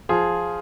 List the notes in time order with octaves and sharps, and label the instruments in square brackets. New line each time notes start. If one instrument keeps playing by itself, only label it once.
[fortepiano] F3 F4 G#4